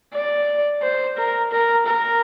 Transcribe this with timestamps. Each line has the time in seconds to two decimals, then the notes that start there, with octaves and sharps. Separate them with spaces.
0.13 D5
0.82 C5
1.17 A#4
1.52 A#4
1.86 A#4